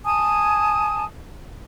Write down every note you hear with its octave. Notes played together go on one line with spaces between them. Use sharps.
G#5 A5 D#6